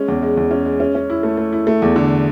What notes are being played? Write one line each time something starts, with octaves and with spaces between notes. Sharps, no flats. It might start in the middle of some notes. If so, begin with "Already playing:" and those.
Already playing: G#3 C#4
E2
G#3
E2
C#4
G#3
C#4
C#4
E4
A3
A3
E4
A3
E2
D3